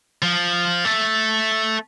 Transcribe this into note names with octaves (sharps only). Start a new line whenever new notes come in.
F3
A3